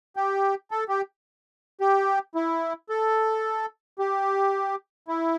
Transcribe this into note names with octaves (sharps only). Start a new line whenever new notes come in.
G4
A4
G4
G4
E4
A4
G4
E4